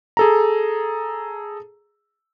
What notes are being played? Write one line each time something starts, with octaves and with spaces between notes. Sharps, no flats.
G#4 A4 A#5